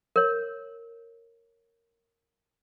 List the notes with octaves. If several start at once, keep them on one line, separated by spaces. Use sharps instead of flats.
A#4 C#5